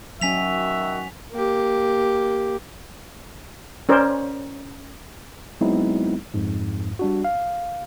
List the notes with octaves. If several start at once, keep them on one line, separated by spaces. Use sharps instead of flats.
D#3 F#3 C#4 F#4 E5 G#5 B6 F7
A#3 G4
C#4 A#4 C5 D5
F#3 G#3 B3 C4 D#4 E4
F2 G#2
G3 D4 F#4
F5